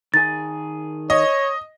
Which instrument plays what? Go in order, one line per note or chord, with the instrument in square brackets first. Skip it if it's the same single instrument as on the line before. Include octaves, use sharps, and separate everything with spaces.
[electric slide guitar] D#3 G#4 [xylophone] A6
[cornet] C#5 [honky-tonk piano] D#5